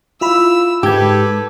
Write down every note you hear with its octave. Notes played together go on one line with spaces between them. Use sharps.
E4 F4 B5 E6
G#2 G4 A4 B4 D6 G#6